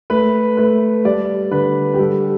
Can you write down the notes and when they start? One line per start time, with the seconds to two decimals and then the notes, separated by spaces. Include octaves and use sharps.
0.10 A3 B4
0.57 A3 B4
1.05 G3 D5
1.51 D3 B4
1.94 G4
1.99 G3 A4